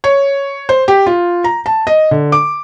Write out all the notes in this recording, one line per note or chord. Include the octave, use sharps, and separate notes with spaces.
C#5
C5
G4
F4
A#5
A5
D#5
D3
D6